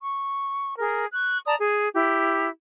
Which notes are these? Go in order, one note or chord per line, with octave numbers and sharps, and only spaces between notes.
C#6
G#4 A#4
C#6 F#6
D5 A5 A#5 D#6
G#4
E4 G4